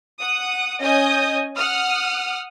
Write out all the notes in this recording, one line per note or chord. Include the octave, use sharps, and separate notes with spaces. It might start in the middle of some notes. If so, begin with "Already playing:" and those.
F#5 D#6
C#4 D#5 G#5 D#6 G6
F#5 D#6 F6